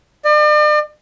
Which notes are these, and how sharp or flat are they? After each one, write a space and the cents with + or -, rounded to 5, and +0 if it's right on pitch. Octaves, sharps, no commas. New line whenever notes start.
D5 +40